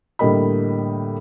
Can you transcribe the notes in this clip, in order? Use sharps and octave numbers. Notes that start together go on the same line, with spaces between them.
A2 D3 G3 A#3 D#5 B5